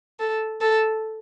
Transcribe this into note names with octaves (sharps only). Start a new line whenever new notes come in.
A4
A4